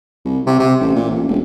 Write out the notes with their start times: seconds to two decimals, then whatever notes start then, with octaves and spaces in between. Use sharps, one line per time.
0.25 C2
0.47 C3
0.59 C3
0.80 A1
0.96 A#2
1.10 A1
1.28 E1